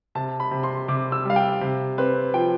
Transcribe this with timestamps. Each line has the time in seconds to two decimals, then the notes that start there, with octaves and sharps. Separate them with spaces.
0.15 C3 A5
0.40 B5
0.51 C3
0.63 C6
0.88 C3 D6
1.12 E6
1.25 G3 F5
1.36 G5
1.61 C3
1.98 C4 B4
2.34 F3 G5